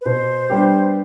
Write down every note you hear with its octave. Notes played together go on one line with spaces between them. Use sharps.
B4
B2 C5
G3 B3 D4 G4